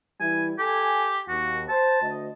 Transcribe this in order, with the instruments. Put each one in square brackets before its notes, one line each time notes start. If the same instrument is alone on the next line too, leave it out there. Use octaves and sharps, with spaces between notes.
[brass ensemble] E3 G3 E4 [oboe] G#5
[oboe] G4 [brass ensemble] A4 G#5
[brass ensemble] D#2 [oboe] F#4
[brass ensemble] C5 [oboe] A5
[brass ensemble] D2 D#5